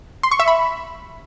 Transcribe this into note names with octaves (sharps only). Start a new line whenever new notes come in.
C6
C#6
E5
B5